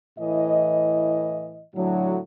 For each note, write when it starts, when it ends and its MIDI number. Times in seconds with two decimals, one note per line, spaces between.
0.19 1.64 45
0.19 1.64 52
0.19 1.64 75
1.76 2.18 45
1.76 2.18 50
1.76 2.18 54